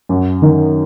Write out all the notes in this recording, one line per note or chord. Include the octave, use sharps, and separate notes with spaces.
F#2
D#3